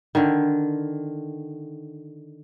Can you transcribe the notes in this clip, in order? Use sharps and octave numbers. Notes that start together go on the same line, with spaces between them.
D3 D#3